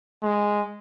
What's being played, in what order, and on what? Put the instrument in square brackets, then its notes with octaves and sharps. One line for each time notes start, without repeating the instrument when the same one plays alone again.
[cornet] G#3